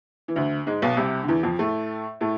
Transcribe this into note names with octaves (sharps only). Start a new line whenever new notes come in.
E3
D2 D3
G#2 G#3
B1 B2
C2 C3
D3
E2 E3
F2 F3
A2 A3
A2 A3